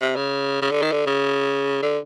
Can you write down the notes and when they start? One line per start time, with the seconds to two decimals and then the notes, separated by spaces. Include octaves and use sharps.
0.01 C3
0.16 C#3
0.62 C#3
0.71 D3
0.82 D#3
0.92 D3
1.07 C#3
1.83 D3